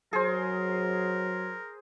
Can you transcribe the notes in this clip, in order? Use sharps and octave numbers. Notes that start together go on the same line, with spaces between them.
F#3 G#4 A#4 C5